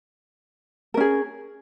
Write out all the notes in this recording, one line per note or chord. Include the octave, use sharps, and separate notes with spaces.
C#4 G#4 A#4